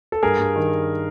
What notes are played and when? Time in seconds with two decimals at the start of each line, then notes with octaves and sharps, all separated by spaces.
0.12 A4
0.23 G2 G#4 A#4
0.39 G2
0.56 D#3